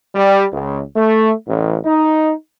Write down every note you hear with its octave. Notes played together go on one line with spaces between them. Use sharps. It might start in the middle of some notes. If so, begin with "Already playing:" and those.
G3
C#2
A3
A1
D#4